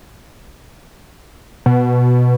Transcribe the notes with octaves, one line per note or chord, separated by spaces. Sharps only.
B2